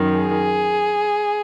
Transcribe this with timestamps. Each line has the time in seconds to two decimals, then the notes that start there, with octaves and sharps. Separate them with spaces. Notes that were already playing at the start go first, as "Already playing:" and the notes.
Already playing: F#2 D#3
0.18 G#4